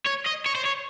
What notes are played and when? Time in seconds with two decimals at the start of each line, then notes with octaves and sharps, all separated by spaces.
0.07 C#5
0.26 D#5
0.46 C#5
0.55 C5
0.66 C#5